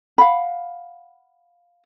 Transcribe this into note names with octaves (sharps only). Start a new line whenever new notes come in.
F5 F#5 B5